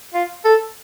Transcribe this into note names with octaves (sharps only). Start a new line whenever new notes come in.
F4
A4